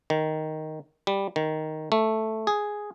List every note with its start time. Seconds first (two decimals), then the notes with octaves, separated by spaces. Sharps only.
0.10 D#3
1.07 G3
1.36 D#3
1.92 A3
2.47 G#4